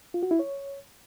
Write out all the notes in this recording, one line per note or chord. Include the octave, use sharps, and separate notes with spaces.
F4
F#4
E4
C#5